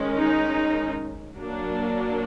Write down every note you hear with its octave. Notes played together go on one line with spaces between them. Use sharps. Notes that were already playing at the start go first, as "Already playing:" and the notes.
Already playing: D#3 G#3 C#4
D#4
F#3 A#3 D4